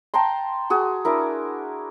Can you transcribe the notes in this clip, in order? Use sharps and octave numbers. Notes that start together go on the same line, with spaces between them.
G5 A5 A#5 C6
F#4 G#4
D4 E4 A#4